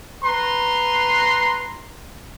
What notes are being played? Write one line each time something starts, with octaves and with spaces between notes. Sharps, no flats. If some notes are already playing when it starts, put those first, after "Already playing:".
B4 A#5 C6